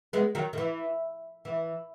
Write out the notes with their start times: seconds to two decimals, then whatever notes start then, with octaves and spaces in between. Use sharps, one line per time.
0.13 G#3 B3
0.35 D#3 F#3
0.53 D#3
0.58 E3
1.45 E3